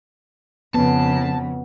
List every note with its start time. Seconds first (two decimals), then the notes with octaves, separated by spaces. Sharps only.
0.74 F2 C#3 B3 A5